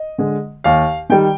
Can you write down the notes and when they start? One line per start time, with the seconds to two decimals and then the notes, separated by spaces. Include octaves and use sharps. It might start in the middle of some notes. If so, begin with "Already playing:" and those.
Already playing: D#5
0.18 D3 G#3
0.64 D#2 F5
1.10 D#3 G3 G5